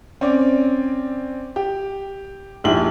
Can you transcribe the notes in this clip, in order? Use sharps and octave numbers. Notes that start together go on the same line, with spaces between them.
C4 C#4 D5
G4
A#1 G#2 E4 G4 F#7